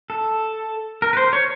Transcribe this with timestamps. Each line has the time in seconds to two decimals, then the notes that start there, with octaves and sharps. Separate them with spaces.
0.10 A4
1.02 A#4
1.13 B4
1.17 C5
1.33 C#5